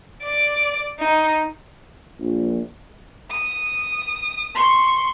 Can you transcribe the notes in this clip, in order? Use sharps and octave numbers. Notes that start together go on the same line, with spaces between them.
D5
D#4
A#1
D#6
C6 C#6